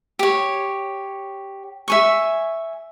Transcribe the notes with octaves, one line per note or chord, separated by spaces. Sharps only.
G4 C#5
E5 G#5 C#6